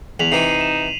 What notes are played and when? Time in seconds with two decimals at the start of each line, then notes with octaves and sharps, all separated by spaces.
0.20 E2 B6 F7 F#7
0.32 C3 E3 D#4 C7 D#7
0.61 E7